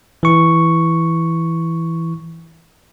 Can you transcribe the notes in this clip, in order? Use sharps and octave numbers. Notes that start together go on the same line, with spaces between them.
E3 C#6